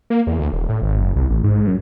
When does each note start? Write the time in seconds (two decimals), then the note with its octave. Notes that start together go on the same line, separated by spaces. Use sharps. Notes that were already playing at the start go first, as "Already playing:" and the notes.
0.10 A#3
0.27 E2
0.39 D2
0.52 D#1
0.69 A2
0.82 G#1
1.00 F#1
1.16 C2
1.30 A1
1.44 G#2
1.67 F#2